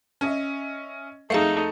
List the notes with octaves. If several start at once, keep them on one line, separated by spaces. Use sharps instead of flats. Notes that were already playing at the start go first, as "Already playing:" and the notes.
C#4 D#5 E5
F2 A3 D#4 G#4 A4 F5 C7